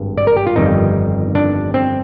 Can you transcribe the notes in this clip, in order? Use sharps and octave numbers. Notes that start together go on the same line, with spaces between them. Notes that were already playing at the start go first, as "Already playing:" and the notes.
Already playing: G#1 G2
D5
A#4
G4
F4
G1 F2 D#3 G3 D#4
D4
C4